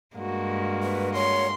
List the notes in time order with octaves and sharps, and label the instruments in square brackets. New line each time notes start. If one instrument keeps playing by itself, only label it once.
[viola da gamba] G2 G#3 [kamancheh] A#3 F#4
[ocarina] B4
[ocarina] C#5 [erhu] C6